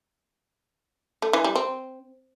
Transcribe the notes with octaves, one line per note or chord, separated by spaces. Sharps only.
A3
E3
G3
C4